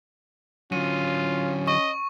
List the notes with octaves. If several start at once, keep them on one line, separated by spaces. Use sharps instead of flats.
D3 F#3 C#4 F4 D#7
D#5 C#6